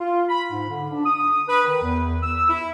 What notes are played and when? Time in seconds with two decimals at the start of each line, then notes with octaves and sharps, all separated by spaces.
0.01 F4
0.29 B5
0.51 G#2
0.69 D3
0.91 D4
1.06 D#6
1.49 B4
1.66 D#3
1.83 E2
2.23 E6
2.50 E4